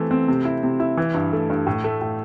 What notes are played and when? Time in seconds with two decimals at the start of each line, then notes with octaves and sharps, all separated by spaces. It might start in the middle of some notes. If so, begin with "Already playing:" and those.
Already playing: E3 A3 C4
0.11 C4
0.28 C3
0.45 E4
0.63 C3
0.80 E4
0.98 E3
1.14 G2
1.33 A3
1.50 G2
1.67 A2
1.84 A3
2.01 A2